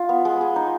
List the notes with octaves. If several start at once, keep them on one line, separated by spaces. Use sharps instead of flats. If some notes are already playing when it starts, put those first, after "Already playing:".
Already playing: F4
B3
G#3
G#4
D#4